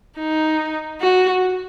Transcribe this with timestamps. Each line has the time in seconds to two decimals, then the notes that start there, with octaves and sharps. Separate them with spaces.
0.19 D#4
1.01 F#4